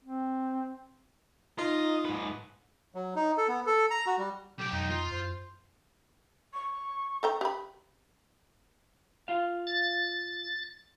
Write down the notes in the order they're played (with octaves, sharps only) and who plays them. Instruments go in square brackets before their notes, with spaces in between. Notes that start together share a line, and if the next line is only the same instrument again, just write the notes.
[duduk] C4
[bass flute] D#4 [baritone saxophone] F4 [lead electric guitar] D#5
[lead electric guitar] G#2 B4
[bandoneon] F#3
D#4
A4
B3
A4
A#5
F#4
G3
[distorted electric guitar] B1 G5 [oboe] G4
[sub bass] F2 [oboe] D#4
[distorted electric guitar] F4
[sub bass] F#2 [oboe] C5
[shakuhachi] C#6
[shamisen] A4 G5 A#5
G4 B5
[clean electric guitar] F4 F5
[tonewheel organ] A6